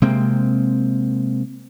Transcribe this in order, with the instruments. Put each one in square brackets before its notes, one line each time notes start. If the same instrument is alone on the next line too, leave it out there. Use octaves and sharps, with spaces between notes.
[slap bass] C3 G#3 A#3 C4